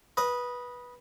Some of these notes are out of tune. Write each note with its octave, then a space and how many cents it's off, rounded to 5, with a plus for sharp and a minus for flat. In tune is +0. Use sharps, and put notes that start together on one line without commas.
B4 -15 D#5 +0